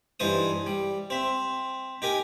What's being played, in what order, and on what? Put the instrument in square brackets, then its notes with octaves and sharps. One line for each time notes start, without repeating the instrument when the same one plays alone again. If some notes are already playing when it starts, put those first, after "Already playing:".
[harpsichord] G2 E3 D#4 C5 D#6
G3
C4 E5
D#4 G4 A#4 G#5